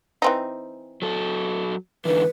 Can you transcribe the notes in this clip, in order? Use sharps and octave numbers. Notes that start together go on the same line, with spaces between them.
E3 C4 D#4
F#3 A4
G#2 D3 E3 B4